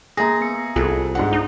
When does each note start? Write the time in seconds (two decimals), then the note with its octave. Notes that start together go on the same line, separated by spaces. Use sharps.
0.17 A#3 G#4 A#5 A#6
0.41 B3 C#7
0.76 C2 F4 G#4 A4
1.15 G#2 D4 F#5
1.33 D#4